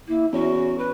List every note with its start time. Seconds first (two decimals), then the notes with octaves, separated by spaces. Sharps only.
0.08 A#3 E4
0.32 E2 C#4 F#4
0.78 B4 B5